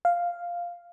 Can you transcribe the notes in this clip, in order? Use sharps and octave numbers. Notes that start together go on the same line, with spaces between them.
F5